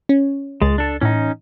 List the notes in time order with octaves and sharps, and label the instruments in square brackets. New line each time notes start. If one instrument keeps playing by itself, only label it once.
[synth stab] C#4
[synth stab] C#2 A6 [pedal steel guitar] G#3
[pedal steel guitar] D4 A4
[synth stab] A2 E3 [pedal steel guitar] C#4 D#4